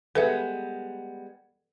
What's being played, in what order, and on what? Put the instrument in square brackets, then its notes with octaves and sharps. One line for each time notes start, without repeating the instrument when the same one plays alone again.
[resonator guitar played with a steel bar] G3 G#3 B3 [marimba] A4 B4 E5